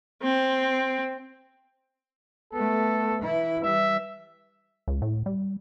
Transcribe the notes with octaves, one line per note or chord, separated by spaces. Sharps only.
C4
A3 B3 A4
E3 E4
E3 G3 E5
C#2
A2
G3